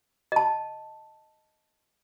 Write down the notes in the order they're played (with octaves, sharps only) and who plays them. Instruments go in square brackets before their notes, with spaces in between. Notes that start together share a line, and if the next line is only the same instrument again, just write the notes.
[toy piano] D#5 A5